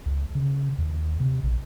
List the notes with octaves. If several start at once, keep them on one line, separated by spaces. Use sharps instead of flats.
C#2
C#3
D#2
C3
A#1